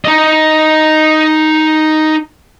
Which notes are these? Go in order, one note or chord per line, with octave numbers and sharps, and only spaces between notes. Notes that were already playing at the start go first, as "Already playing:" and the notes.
D#4 D#5